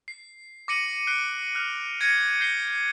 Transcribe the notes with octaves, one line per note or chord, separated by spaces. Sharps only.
C7
D6 A#6 C#7 D#7 F#7
F#6 C7 D7 G7
F6 F#6 F7
G#6 A#6 C#7 D#7
G6 A#6 C7 G7